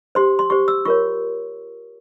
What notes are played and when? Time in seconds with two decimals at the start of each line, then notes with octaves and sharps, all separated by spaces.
0.15 G4 C5 C6
0.39 C6
0.50 G4 C5 C#6
0.68 E6
0.85 F4 A#4 C#5 C#6